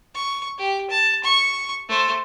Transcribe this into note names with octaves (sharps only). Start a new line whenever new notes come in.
C#6
G4
A5
C#6
A3 C5